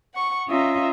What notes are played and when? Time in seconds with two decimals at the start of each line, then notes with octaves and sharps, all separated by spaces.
0.14 F#5 C#6
0.48 C#4 F4 D#5 E5 A#5